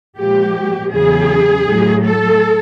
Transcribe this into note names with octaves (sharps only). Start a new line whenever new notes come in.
A#2 F3 G#3 G4
E2 C#3 F#3 G#4
A2 F#3
A4